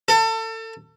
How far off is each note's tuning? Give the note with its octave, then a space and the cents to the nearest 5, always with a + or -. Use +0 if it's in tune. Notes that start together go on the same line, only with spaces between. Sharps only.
A4 +30